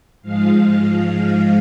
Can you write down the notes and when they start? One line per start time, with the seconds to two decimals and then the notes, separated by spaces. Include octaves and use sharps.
0.22 G#2 F3 G#3 F5